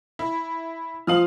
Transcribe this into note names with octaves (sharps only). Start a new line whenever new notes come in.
E4
F3 F5 D#6 F6 F#7